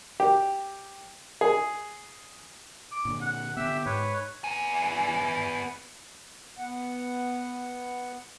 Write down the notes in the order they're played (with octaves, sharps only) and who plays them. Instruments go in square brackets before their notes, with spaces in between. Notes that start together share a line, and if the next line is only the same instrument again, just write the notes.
[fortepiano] G4
G#4
[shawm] D6
[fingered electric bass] A#2 D3
[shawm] F#5
[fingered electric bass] D3 B3 [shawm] G4 [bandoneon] E5 E6
[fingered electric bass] G#2 [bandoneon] B4 C#5
[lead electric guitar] B3 G#5
[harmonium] B3 F#5